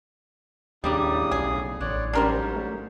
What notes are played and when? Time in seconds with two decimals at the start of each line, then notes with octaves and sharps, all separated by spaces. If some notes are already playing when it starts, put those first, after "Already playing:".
0.84 D#2 A2 C#3 G3 A#3 D4 D#6
1.31 B1 G#4
1.80 A1 D3 C#5 D5 F#6
2.13 G#2 F#3 G3 C#4 D4 A#4 C5
2.55 A3